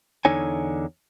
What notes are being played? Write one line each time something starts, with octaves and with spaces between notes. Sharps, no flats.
E2 D3 D#4 C#5 G#5